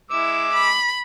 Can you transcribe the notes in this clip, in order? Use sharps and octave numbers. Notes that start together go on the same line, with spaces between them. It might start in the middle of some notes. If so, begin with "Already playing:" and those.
G#3 E4 D6 E6
B5